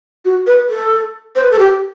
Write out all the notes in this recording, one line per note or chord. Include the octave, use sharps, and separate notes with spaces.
F#4
B4
A4
C5
B4
A4
G4